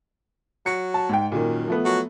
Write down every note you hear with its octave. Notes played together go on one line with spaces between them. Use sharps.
F#3 C#7
A5
G#2 G5
F#2 A#2 D#3
F3 A3 B3
F#3